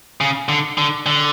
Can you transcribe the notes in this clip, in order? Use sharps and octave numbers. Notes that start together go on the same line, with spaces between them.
C#3
D3
D3
D3